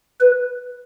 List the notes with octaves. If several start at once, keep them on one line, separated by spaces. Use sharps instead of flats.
B4